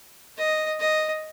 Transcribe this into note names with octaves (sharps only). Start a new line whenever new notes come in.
D#5
D#5